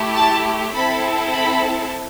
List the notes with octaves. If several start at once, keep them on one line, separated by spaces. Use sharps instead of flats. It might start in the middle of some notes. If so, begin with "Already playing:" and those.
Already playing: A3 E4 G4
A5
C4 E4 A4 B5
B5